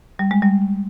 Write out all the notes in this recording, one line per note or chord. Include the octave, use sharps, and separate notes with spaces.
G3
G#3
G3